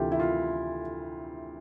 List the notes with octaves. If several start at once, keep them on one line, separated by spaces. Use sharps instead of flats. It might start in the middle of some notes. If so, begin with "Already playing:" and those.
Already playing: D2 C3 E3 A3 F4 G4
E4
F4